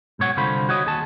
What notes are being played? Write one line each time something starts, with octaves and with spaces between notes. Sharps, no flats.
G#2 B2 C#5 F#5
C2 D3 F4 C5 B5
F#4 C#5 D#5
D#2 G#4 A5